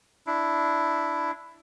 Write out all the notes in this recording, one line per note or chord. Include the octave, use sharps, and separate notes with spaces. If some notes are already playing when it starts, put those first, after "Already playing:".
D4 E4